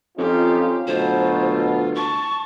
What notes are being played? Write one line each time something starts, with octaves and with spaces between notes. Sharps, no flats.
F2 C#4 D#4 F4 G4
D2 B2 F#3 F4 C5
A5 C#6